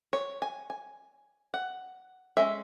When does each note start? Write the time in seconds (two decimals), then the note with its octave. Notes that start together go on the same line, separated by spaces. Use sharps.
0.13 C#5
0.42 G#5
0.70 G#5
1.54 F#5
2.37 G#3 C#4 E5